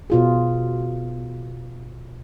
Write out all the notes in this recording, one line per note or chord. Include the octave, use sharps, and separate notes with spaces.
B2 F4 G#4